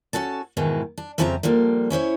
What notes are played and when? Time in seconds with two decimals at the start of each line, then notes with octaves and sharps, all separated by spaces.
0.13 C#4 F#4 A4 A5
0.57 G#2 B2 D#3 E3 G#3
0.98 D4
1.18 F2 C#3 F3 C4 E5 A#5
1.43 D3 F3 G3 A#3
1.90 C#4 E4 C5 C#5